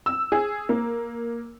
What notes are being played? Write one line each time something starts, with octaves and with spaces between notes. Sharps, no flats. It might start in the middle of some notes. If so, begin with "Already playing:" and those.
E6
G#4
A#3